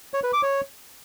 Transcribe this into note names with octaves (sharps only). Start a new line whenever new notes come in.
C#5
B4
D6
C#5